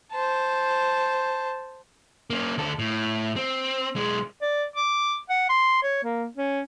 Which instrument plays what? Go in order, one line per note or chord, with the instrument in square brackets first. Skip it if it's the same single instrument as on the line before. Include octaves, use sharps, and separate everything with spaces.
[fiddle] C5 A5
[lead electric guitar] A#3 C#4
D2 A4
A2
C4
B1 G#3
[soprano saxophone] D5
D6
F#5
C6
C#5
A#3
C#4